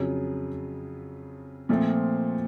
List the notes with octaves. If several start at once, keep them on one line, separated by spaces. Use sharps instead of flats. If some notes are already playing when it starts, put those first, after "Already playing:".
Already playing: F2 C#3 F#3
A#2 F3 A3 C4